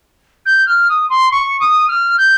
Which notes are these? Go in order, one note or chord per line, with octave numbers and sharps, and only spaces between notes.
G6
F6
D#6
C6
C#6
D#6
F6
G6